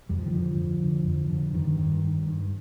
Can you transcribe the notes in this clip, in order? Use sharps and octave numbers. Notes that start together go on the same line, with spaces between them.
F2 G3
F3
D#3
D3 F3
F2
D3
F2
D3
G2 D#3
G2
G2
G2